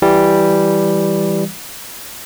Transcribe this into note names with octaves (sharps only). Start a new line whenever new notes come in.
E3 G3